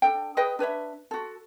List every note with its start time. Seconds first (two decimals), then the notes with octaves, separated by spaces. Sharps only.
0.02 D4 A4 G5
0.37 G#4 B4 D#5 G5
0.59 D4 B4 C#5 E5
1.11 F#4 A4